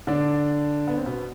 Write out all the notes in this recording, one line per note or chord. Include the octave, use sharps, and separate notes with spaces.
D3 D4
B3
C4
B2 B3